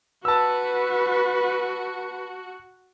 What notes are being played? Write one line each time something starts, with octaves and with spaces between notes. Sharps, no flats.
F#4 B4 A5 E6